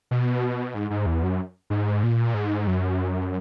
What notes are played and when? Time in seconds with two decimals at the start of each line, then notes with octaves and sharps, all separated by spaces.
0.11 B2
0.75 G#2
0.90 G#2
1.06 E2
1.23 F#2
1.70 G#2
2.03 A#2
2.34 G#2
2.67 F#2